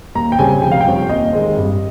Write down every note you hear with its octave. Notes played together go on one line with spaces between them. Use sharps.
D#2 A#5
G5
C#3 G3 C4 G#5
F1 G5
F5
G5
F2 C3 G3 C#4
D#2 D#5
D#3 G#3 C4
G2